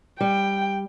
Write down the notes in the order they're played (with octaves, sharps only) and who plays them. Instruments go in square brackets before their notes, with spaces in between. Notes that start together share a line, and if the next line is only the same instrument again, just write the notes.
[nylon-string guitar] G3 [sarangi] G5